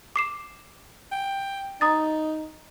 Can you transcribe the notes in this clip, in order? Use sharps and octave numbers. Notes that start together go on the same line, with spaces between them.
D6 C7 E7
G5
D#4 A#5 D#6 A6